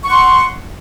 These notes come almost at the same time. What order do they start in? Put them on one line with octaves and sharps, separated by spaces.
C#6 F#5 C6